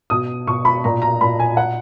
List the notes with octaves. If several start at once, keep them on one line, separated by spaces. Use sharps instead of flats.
B2 D#6
B2 C#6
B5
A#2 A#5
A#5
A#2 B5
G#5
F#5